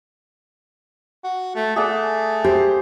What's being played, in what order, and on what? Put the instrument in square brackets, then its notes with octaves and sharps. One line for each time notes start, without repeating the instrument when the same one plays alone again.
[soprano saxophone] F#4
A3
[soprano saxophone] A3 [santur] G#4 D5 F#5
[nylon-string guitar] G4 [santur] C5